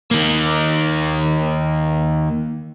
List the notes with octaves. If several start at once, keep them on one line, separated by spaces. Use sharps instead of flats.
D#3 A#3